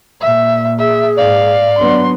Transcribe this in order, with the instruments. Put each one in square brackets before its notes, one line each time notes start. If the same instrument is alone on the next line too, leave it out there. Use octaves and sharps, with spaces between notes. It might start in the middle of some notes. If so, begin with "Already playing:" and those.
[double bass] A#2 [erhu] E5
[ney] G#4 [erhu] E5
[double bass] G#2 [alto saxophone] D5 [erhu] F5
[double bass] F#3 B3 [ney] D4 [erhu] C6